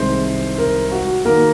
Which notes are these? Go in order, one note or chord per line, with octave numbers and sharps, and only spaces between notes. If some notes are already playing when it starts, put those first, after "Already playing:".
Already playing: C2 C3 D#3 G#3 C4 C5
A#4
F#4
D#3 A#3 A#4